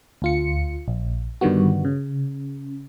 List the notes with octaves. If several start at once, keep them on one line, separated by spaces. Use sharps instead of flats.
D2 F4 C#7
A#1
G2 D3 D#3 G3 B3 F#4
C#3